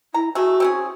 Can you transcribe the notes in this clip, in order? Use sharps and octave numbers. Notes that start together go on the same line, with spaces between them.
E4 A#5
A3 F#4 G#4
C4 C#4 G#4